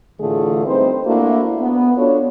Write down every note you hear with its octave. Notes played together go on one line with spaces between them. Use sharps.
A2 D3 E3 A3 F4 G#4
G3 C4 D#4 B4 C5
A3 A#3 D4 E4 F#4
B3
D4 F4 F#4 A4 C#5